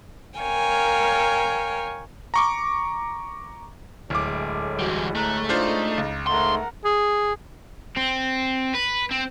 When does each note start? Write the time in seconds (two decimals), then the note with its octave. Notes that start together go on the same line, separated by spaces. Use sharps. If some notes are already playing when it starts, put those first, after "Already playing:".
0.39 A#4 C#5 F5 G5 G#5
2.34 A#5 C#6 D6
4.10 D1 A2 G#3 D6
4.79 E3 G3 F#4 F#5
5.15 A3 A#5 F#6
5.49 D4 D#4 F4 C5 D#5
5.98 C#2
6.27 G#2 A3 A#4 F#5 C6
6.85 G#4
7.97 C4
8.74 B4
9.11 C4